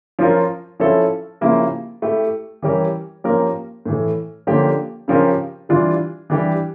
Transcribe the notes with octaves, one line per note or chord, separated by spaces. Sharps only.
F3 C#4 F4 A#4
F3 C#4 E4 A4
C#3 F3 A#3 E4 G4
A3 E4 G4
E3 G3 C#4 G4 A#4
F3 A#3 C#4 G4 A#4
A2 E3 A3
D3 F3 A#3 C#4 G4
C#3 F3 C#4 G4 A#4
E3 G3 D4 F4
E3 G3 D4 G4